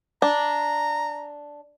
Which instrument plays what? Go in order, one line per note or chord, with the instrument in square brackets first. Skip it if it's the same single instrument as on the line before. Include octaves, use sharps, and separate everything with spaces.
[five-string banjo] D4 [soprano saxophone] A#5